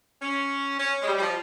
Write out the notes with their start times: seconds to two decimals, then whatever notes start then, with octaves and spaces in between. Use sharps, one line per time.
0.21 C#4
0.79 C#4
1.01 G#3
1.07 G3
1.17 G3
1.21 F3